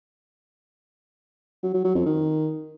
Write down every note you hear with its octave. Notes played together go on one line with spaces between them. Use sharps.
F#3
F#3
F#3
F2
D#3